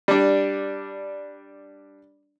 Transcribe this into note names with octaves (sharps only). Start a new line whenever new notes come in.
G3 D4